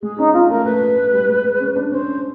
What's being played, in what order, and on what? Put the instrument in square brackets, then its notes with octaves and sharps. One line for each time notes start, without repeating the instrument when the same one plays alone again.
[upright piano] G#3 [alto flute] G#4
[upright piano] C#4 [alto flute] D#4
[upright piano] C#4 [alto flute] F4
[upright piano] A3 [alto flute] A#4
[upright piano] A3 [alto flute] B4
[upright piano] A3
A3
G3
G#3
G#3
C#4
D4
[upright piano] C#4 [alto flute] C5